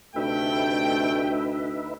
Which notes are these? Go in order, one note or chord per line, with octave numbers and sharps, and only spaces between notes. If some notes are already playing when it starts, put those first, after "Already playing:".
D2 C3 A3 D#4 B4 E5 G5